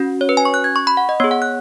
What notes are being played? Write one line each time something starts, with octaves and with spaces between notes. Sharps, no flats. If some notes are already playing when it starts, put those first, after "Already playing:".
Already playing: C#4 F#4
C#5
B4
G#5
C#6
F#6
G#6
C#6
B5
F#5
D#5
B3 G#4 C#5
F#5
F#6